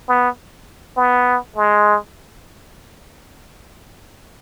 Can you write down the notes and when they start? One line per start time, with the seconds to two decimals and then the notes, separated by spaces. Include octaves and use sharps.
0.08 B3
0.97 B3
1.56 G#3